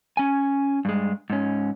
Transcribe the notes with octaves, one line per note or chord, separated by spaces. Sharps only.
C#4 G#5
G2 G#3
G#2 C#4